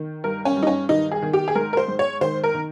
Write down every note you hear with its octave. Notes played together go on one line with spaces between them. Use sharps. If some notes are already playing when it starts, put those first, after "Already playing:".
Already playing: D#3
G2 A#4
C#4
G2
D#4
C#4
D#3 D#4
G#4
D#3
G4
G#4
G#2 A#4
A#4
C5
G#2
C#5
D#3 C5
A#4
D#3